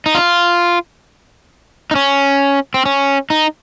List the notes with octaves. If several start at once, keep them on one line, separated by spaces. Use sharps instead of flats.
D#4
F4
D#4
C#4
C4
C#4
D#4